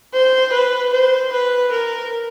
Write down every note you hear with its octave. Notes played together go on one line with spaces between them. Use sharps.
C5
B4
C5
B4
A#4